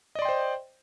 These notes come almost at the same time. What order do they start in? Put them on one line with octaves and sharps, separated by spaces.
D#5 D5 C6 G5 C5